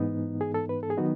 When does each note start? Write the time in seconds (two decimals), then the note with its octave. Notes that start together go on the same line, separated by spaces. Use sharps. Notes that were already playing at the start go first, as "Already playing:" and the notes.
Already playing: G#2 E3 B3 D#4
0.41 G#4
0.54 A4
0.69 B4
0.83 A4
0.90 G#4
0.97 D#3 F#3 B3 D#4 F#4